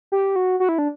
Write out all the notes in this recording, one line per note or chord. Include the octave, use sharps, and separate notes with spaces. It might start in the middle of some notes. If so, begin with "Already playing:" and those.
G4
F#4
F#4
E4
D4